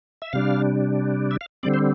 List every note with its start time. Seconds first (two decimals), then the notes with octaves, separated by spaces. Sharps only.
0.22 E5
0.33 C3 G3 D4 F5
1.31 E5
1.41 F5
1.63 D3 G3 C4 D5
1.74 C5